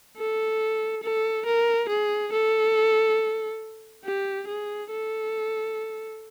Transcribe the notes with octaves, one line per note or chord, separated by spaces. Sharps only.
A4
A4
A#4
G#4
A4
G4
G#4
A4